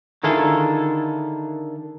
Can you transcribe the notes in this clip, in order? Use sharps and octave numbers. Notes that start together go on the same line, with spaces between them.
D3 D#3 E4 F4 G#4 A4